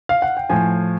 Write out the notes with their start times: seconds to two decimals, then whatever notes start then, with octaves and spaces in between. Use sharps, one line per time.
0.09 F5
0.22 F#5
0.37 G5
0.50 A2 F3 G#5